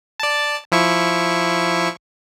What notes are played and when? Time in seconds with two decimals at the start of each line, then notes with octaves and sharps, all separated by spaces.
0.20 D5 A5
0.72 F3 E4 C#6